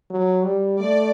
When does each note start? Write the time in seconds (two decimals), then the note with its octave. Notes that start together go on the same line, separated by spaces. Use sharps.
0.11 F#3
0.45 G3
0.80 A3 D5